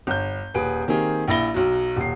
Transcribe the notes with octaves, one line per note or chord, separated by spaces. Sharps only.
G1 G6
D#1 G#4 B4 D7
D#3 A#3 C4 G4 G#4
A#1 E4 B5 A#6 G7
B1 F#3
D#1 C7